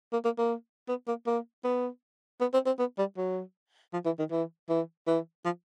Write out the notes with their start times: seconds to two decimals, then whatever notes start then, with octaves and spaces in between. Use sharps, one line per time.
0.13 A#3
0.25 A#3
0.38 A#3
0.88 B3
1.08 A#3
1.26 A#3
1.64 B3
2.41 B3
2.53 C4
2.66 C4
2.79 B3
2.98 G3
3.17 F#3
3.93 F3
4.05 E3
4.19 D#3
4.31 E3
4.69 E3
5.07 E3
5.45 F3